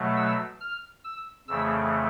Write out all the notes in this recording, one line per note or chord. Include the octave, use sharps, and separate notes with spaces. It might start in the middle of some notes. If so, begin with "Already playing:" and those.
Already playing: B2 F#3 A3
E6
F6
E6
F2 C#3 E3 A3 E6